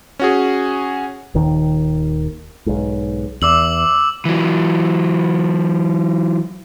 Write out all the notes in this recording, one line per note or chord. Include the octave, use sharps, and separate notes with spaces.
C#4 F#4 G#4
D#1 D#2 D#3
B1 G#2
E2 D6 E6 F#7
E3 F#3